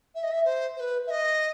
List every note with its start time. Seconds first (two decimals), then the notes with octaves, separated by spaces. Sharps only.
0.15 E5
0.23 D#5
0.31 E5
0.45 C5
0.77 C5
0.80 B4
1.07 E5
1.11 D#5